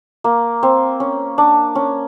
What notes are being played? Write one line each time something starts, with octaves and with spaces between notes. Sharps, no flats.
A#3
C4
C#4
D4
C#4